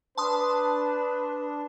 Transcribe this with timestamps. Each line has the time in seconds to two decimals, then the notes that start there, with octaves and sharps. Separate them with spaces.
0.18 D4 B4 A5 C6 D#6